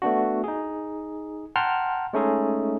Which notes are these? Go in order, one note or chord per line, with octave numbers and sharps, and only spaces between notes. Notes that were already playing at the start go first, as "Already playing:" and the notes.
A3 B3 D4 F#4
D#4 G#4
F#5 G5 A5 A#5 C6 F6
G#3 A3 C#4 D#4 G#4 A4